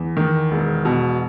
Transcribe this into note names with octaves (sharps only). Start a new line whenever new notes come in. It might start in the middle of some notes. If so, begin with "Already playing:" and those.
Already playing: E2
D#3
E1
B2